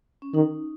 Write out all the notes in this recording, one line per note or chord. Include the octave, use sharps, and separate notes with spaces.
C#4
D#3 D#4